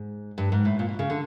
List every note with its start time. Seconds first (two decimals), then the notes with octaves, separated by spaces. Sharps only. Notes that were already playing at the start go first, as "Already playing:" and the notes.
Already playing: G#2
0.38 G2
0.52 G#2
0.65 A2
0.79 A#2
0.89 B2
0.99 C#3
1.10 D3